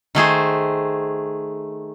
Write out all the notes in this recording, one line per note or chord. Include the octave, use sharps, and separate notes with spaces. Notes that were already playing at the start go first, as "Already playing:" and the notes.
D#3 A3 G#4 C5